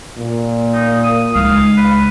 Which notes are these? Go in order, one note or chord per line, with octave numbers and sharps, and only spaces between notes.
A#2
D#4
D#6
C#2 D#4 F5
B4